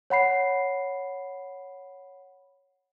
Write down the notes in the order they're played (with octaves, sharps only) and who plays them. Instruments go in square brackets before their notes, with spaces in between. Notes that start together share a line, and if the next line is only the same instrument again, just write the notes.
[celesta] C#5 F#5 B5 C7